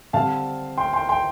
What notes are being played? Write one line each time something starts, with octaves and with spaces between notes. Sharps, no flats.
D3 G3 C4 F5 A5
G5 C6
G5 C6
G5 C6